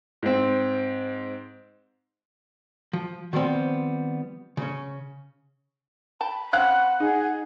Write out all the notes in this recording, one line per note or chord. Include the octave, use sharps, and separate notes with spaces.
G#2 C4
F3
D#3 F3 G3 B3 C4
C#3 C#4
G5 A5 B5
C4 C#4 F5 F#5 F#6
D#4 G#4